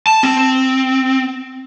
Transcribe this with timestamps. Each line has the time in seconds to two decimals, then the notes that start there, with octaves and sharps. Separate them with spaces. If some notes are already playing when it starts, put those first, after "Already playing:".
0.07 A5
0.23 C4